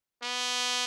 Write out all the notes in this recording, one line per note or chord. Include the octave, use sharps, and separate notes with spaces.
B3